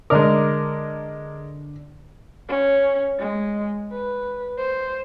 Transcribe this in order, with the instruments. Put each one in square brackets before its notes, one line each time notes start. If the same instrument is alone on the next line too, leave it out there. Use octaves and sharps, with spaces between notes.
[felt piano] D3 D5 D6 [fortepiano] G#3 D4 A#4
[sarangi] C#4
G#3
B4
C5